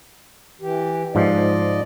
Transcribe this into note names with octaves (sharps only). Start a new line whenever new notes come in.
E3 G4
G#2 F3 D5 D#5